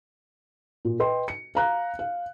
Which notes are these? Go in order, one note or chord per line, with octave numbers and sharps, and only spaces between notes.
A#2
B4 D#5 G5 C6
C#7
F5 A#5 F#6
F5